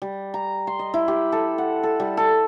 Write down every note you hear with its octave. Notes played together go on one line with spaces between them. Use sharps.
G3
A#5
C6
D#5
E4
G4
A4
F#5
A4
G3
A4